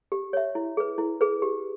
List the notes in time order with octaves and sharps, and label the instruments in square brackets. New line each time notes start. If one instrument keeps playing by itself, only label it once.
[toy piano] G4
C#5 E5
E4
G#4 B4
E4
G#4 B4
G4